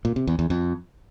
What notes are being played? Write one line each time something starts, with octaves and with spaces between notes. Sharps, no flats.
A#2
C3
E2
E2
F2